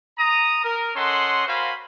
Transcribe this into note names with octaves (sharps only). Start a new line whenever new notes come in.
A#5 D#6
A#4
C#4 A4 D#5 F#5 C6
F#4 A#4 C5 F5 G#5 B5